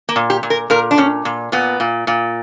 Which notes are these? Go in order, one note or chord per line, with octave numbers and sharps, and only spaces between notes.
A#3
A#2
G4
A#2
A#4
A#2 A#4
D4
A#2 C#4
A#2
A#2 B3
A#2
A#2